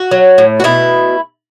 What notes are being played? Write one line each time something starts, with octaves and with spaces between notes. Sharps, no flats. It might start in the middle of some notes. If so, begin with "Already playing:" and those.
Already playing: F#4
F#3
A2
F#4
B2 E4